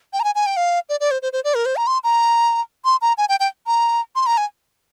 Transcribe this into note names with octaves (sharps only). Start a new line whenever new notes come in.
G5
A#5
G#5
G#5
G5
F5
D5
D5
C5
C5
C5
D5
A#4
C5
A#5
C6
A#5
C6
A#5
G#5
G5
G5
A#5
C6
A#5
G#5